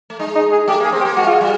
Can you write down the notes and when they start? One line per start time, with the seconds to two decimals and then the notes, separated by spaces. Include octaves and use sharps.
0.10 A3
0.19 G#3 D#4
0.35 D#4
0.52 G#4
0.68 A3 G4
0.80 A#3 G#4
0.92 C4
1.01 G4
1.05 A#3
1.17 G#3 F#4
1.26 F4
1.33 F#4
1.41 G3